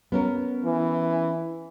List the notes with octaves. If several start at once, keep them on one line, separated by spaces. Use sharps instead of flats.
B3 C#4 A#4
E3